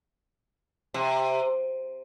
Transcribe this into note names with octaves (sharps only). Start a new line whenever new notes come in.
C3